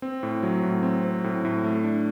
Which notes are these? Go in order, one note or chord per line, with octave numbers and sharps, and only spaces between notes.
C4
A2
F#3
A2
C4
C4
A2
A2
A3
D4